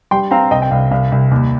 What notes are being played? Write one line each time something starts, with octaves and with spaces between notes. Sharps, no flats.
G3 G5 C6
C4 F5 A#5
C2 D#5 G5
G5
C2 F5
C2 F5
C2
D#2